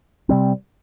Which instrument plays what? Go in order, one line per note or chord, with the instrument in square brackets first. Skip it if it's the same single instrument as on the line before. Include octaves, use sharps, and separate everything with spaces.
[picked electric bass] C3 G3 C4